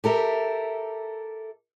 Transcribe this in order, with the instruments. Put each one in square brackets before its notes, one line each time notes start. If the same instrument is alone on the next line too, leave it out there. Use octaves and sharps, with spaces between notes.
[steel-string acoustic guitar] G4 A4 A#4 E5